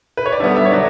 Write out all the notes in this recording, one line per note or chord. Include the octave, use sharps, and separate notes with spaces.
B4
C#5
D5
D3 G3 B3 E5
E5
C#5
D3 F#3 D5